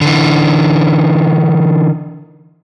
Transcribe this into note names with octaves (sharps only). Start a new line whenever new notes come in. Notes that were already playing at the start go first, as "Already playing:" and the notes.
D3 E3